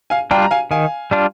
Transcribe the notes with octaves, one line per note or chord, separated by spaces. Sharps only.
F5 G#5
G3 D4 F4 G5 A#5
A#5
F5 G#5
D#3 F5 G#5
G3 D4 F4